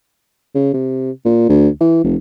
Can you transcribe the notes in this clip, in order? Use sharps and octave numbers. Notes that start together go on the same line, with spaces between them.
C#3
C3
A#2
D2
E3
F1